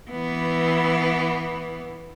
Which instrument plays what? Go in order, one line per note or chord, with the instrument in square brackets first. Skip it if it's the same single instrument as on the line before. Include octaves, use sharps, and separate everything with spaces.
[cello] E3 B3